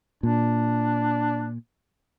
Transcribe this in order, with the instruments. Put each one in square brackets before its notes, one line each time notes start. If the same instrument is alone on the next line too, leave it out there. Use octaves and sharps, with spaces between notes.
[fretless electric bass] A#2 [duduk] D4